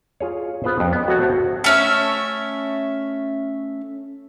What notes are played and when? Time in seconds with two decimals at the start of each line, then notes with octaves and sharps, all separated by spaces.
0.20 F4 G#4 C#5
0.64 B3 F4 B4 C5
0.80 F2
0.93 B3
1.08 F#4 A4 C#5
1.19 F#4 C5 E5 F#5 A5
1.64 A3 C#4 E5